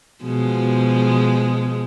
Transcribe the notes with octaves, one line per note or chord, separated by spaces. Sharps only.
B2 F3 G#3